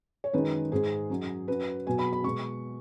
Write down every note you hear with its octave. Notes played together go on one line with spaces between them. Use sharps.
C#5
F#2 D#3 G#3 B4
G#2 G#3 G#4
F#2 F#3
F#2 F#3 B4
B2 F#3 G#5
B5
B5
B2 G#3 C#6